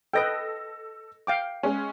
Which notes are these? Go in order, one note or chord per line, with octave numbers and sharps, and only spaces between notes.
A4 B4 D#5 G5 A#6
F5 G5 D6
G#3 C#4